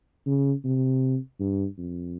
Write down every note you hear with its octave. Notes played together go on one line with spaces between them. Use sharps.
C#3
C3
G2
F2